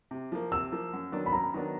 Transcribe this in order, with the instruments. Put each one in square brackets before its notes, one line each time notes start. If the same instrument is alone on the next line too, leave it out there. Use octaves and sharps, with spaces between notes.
[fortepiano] C3
F3 A#3
[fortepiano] C3 [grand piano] E6
[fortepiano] F3 A#3
F#2
D#3 F#3 B3 D4
[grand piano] B5
[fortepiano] F#2 [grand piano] A#5
[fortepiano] D#3 F#3 B3 D4